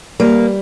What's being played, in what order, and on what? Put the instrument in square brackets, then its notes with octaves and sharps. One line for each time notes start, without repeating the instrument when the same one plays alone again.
[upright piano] G3 [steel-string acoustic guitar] A#3